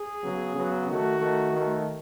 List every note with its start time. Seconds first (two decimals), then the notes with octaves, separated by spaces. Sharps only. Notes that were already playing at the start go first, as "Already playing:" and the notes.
Already playing: G#4
0.22 C#3 F#3 B3
0.54 C#3 F#3 B3
0.88 D#3 A3 F#4
1.19 D#3 A3
1.52 D#3 A3